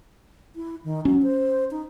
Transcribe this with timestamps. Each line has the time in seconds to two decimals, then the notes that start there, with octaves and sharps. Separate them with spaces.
0.56 E4
0.84 D#3
1.05 F#3 C#4
1.22 C5
1.71 D#4